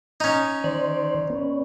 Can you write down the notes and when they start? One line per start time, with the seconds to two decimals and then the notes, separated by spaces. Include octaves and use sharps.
0.20 C#4 D#4
0.64 D#3 C5 D5
1.30 B3 C#4